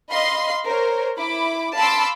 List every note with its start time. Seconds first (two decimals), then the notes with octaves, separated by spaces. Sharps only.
0.11 D#5 F5 B5 C6
0.66 A#4 C5 C#5
1.17 E4 B5 D6
1.76 F5 A5 B5 C6 D6 E6